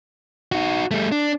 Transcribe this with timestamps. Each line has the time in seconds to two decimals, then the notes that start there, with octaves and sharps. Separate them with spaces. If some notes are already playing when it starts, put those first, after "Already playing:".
0.52 D#4 F#4
0.91 G3 A3
1.12 D4